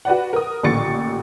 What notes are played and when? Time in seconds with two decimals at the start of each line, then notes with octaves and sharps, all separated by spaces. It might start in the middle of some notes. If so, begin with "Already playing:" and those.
0.05 F#4 B4 D5 F#5
0.33 A#4 D#6
0.63 A1 A#2 D3 C#6 A6 C#7